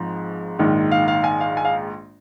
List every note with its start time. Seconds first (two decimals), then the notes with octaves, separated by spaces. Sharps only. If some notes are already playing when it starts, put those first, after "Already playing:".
Already playing: G#1 G#2 F3
0.59 A#1 G#2 D#3
0.92 F5
1.08 F5
1.24 G#5
1.40 F5
1.57 G#5
1.65 F5